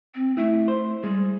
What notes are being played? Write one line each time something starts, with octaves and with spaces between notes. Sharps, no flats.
C4
A3 E4
C5
G3 G#3